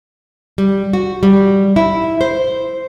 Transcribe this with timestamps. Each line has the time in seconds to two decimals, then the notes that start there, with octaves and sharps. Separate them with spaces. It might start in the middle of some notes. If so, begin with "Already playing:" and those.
0.58 G3
0.93 F#4
1.23 G3
1.76 E4
2.21 C5